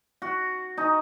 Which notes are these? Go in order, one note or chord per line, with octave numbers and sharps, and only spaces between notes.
F#4
D#4